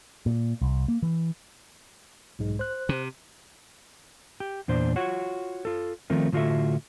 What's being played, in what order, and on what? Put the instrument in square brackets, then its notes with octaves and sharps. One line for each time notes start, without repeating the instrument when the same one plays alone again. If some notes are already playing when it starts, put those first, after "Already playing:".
[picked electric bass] A#2
C2
A#3
E3
[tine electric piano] B1 G#2 G#3
C5 F#6
[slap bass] C3
[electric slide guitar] G4
E2 A#2 D4 C5
F4 F#4 C#5 F#5
F4 A4
D#3 F3 A3 C4 F4 A#4
A2 D3 F4 F#4 A4 E5